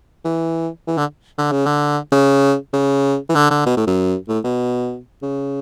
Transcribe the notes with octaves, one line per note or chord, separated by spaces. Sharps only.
E3
E3
D3
D3
C#3
D3
C#3
C#3
E3
D3
D3
B2
A2
F#2
A2
B2
C#3